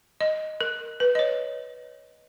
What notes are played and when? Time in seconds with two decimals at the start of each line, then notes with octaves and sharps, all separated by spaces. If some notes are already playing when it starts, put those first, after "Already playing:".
0.20 D#5
0.61 A#4
1.00 B4
1.15 D#5
1.19 C#5